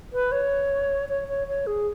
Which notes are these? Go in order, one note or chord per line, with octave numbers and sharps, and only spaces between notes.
B4
C#5
C#5
C#5
C#5
G#4